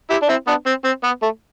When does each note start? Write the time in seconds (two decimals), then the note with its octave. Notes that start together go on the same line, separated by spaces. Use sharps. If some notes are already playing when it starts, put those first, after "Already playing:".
0.10 E4 G4
0.22 D4
0.29 C4 E4
0.47 B3 D4
0.66 C4
0.84 C4
1.03 B3
1.22 A3